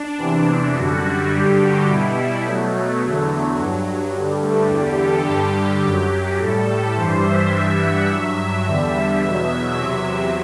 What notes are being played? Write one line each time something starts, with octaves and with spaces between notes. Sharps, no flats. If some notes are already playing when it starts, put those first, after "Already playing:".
Already playing: D4
E2 C3 E3
F#2 D3 G3 F#4
F#4
G2 D3 G3 G4
F#4
B2 G3 E4
B2 F#3 A3
E2 D3 F#3
G2 F#3
G2 D3 G3
A3
E2 D3 G3 G4
A4
G2 D3 G3 G4
F#2 F#3
A2 G3 A4
G2 E3 G3 C5
E5
G2 E3 G3 E5
F#5
G2 F#3 E5
E2 D3 G3
E2 B2 F#3 E5
E2 C3 F#3